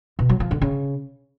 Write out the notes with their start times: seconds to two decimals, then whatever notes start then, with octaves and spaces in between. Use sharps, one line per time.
0.19 B2
0.29 F#3
0.40 F3
0.51 D3
0.62 C#3